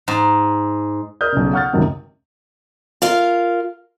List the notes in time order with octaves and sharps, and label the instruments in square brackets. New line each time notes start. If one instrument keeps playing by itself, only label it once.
[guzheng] G#2
[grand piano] A#4 D5 D#5 D#6 F6 G6
B1 C#3
F5 F#5 C#6 F6 G6 A6
C#2 F#2 C3 D#3 F#3
[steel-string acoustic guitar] F4 A#4 F5